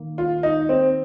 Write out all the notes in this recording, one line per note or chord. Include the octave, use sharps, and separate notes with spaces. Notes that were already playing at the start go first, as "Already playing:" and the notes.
Already playing: D#3 A#3
F4
D#4
C4